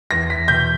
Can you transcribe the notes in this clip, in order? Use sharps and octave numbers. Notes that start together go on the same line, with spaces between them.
E2 A#6
B6
B2 G6